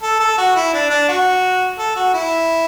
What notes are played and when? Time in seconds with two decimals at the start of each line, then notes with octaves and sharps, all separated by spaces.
0.03 A4
0.20 A4
0.38 F#4
0.56 E4
0.73 D4
0.90 D4
1.09 F#4
1.79 A4
1.96 F#4
2.14 E4